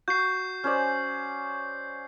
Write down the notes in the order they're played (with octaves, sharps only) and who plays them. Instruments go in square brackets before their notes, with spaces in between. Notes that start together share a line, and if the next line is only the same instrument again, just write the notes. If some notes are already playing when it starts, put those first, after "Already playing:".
[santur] F#4 [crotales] G6 C7
[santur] C#4 C5 D5